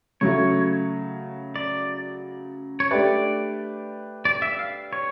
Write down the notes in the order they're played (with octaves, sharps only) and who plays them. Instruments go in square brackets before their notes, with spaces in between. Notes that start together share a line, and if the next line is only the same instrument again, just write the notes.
[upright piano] C#3 F#3 A3 [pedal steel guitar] C#5
[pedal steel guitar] D5
C#5
[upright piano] A3 D4 G4 B4 [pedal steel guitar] D5
[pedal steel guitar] D5
E5
F5
C#5